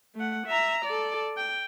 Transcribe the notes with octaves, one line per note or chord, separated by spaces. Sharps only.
A3 F#5
E5 A#5
A4 D5
G5